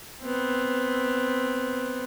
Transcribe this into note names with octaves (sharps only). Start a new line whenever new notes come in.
B3 C4